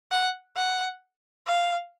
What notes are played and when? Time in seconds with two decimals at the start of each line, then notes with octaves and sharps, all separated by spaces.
0.11 F#5
0.56 F#5
1.47 F5